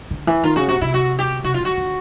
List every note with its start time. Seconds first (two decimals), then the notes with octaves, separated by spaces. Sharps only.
0.11 D3
0.27 E3
0.44 D#3 F4
0.56 C#3 F#4
0.68 C3 F#4
0.81 C3 E4
0.94 F#4
1.19 G4
1.44 C3 F#4
1.54 F4
1.60 D3 F#4
1.77 D3